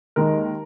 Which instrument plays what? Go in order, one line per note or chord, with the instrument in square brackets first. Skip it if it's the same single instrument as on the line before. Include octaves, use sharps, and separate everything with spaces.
[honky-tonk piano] D#2 D#3 G#3 A#4